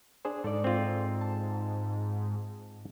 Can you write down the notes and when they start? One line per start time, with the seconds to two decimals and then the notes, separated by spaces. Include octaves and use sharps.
0.25 D4 G#4 C5
0.44 G#2 A4 D5
0.64 C4 F4
1.21 A5